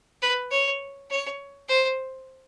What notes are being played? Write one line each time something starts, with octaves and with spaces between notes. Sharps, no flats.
B4
C#5
C#5
C5